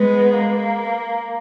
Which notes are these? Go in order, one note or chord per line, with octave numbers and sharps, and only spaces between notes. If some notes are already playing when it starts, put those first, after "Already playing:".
Already playing: G#3 B3
A#3